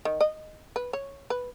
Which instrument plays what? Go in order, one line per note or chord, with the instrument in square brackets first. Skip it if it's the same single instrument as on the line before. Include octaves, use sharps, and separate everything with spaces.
[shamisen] D#3
D#5
B4
C#5
B4